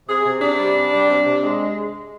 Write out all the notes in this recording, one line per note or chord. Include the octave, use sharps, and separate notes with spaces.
C3 G#4
C3
C3 D4
G3
C3
G3
C3
C3
G#3